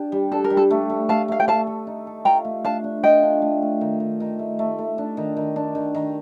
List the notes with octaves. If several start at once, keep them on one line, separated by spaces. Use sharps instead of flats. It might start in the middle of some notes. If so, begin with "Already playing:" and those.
Already playing: D4 G4
G3
D4 A4
A#4
G3
A4
A3
A3
A3 F5 A5
A3 F5
G5
A3 F5 A5
A4
D#4
A4
F4 G5 A#5
A3
D4 F5 A5
D4
F4 D#5 G5
D4
A3
A3
D#3
D#3
D#3
A3
A3
A3
D4
D#3
D#3
D4
D#3
D#3